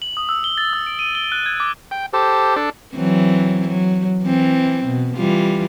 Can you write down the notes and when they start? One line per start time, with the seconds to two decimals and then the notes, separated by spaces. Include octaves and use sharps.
0.02 F#7
0.17 D#6
0.29 E6
0.44 G7
0.58 A6
0.73 E6
0.87 D7
0.99 D#7
1.15 G7
1.32 F#6
1.46 G#6
1.60 D6
1.91 G5
2.13 G4 A4 C5
2.56 D4 A4
2.94 E3 F#3 C4
3.68 F#3
4.24 E3 C4
4.86 B2
5.16 E3 G3 F4